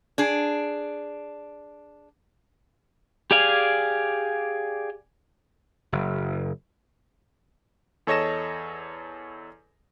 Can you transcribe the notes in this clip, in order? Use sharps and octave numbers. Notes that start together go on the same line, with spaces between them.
D4 G#4
G4 G#4 D5 F5 G#5
F#1
E2 A4 C#5 D#5 A#6 E7